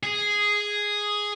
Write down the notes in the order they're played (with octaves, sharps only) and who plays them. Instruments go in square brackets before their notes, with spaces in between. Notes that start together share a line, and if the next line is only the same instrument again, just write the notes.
[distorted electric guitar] G#4